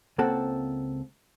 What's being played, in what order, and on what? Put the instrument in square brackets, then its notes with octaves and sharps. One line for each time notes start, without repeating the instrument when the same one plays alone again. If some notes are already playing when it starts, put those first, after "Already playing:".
[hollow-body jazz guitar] C#2 A#3 C4 A4 F#5 A5